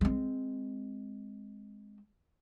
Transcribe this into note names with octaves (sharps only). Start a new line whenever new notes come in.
G#3 C4